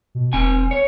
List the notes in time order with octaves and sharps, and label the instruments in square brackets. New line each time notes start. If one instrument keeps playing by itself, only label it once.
[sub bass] B2
[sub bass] E1 [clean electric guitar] C4 G#5
[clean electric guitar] C#5